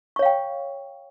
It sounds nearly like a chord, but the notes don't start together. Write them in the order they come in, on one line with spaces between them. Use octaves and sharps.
C#6 C#5 F5 G5